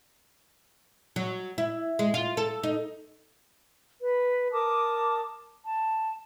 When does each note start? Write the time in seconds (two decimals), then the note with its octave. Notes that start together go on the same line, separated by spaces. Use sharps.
1.16 F#3
1.58 E4
1.99 G#3
2.14 F4
2.37 A4
2.63 D#4
3.99 B4
4.51 A#4 A5 D6 D#6
5.64 A5